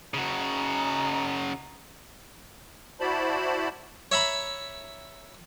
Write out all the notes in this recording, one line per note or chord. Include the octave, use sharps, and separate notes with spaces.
C#3 D#4 F#4
E4 F#4 C5 D5 A5 B5
C#5 E5 A#5 B5